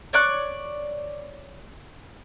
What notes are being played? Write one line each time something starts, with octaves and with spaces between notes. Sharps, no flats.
C#5 D5 C#6 F#6